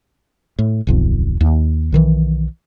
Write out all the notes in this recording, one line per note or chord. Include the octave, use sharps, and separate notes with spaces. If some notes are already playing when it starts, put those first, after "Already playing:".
A2
D1 B1 F2
D#2
B1 D#3 E3